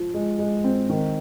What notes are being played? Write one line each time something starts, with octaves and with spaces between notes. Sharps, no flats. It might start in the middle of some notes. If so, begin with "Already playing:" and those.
Already playing: F3
G#3
G#3
C4
D#3